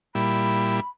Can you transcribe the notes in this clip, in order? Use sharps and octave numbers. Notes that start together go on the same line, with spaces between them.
A#2 G3 E4 B5